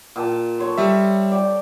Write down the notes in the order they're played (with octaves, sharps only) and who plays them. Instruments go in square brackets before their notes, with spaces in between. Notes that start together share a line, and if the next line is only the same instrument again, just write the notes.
[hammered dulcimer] A#2 G5 A5
A4 C#5 C6
[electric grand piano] G3 E5
[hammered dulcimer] D5 G5